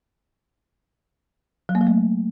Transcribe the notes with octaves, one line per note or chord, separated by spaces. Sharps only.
F#3
A#3
F#3
A3